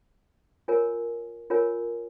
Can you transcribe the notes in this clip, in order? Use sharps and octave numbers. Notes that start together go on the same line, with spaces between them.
F4 A#4 C#5 G#5
F4 A#4 C#5 G#5